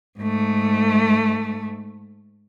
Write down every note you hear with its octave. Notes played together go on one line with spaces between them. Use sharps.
G#2 A3